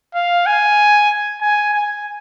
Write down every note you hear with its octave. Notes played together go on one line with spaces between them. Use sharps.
F5
G#5
G#5
G#5